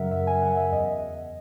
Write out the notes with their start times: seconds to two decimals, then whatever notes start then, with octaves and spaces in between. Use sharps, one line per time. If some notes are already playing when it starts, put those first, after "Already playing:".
Already playing: F#2 C#3 F#3 A#4 E5 F#5
0.11 F#2 E5
0.27 G#5
0.42 C#3 F#3 F#5
0.57 E5
0.72 E2 D#5